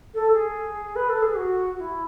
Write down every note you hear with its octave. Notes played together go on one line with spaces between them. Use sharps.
A4
G#4
B4
A4
G#4
F#4
F#4
E4